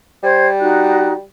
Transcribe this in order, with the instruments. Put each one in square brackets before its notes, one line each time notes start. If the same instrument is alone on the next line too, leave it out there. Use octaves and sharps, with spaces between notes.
[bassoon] G3 [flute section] C5 G#6
[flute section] D#4 F#4 F#6